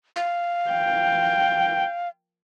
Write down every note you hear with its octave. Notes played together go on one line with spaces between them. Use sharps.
F5
G5